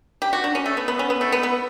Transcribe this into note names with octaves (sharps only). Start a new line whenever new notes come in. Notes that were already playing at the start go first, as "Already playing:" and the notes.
G4
F#4
D4
C#4
A3
B3
B3
C#4
B3
A3
B3
B3